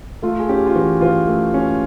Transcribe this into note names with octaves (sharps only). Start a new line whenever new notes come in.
A3 F4
G#4
C#4 G4
F4
E3 F#4
E3 F4
A3
C#4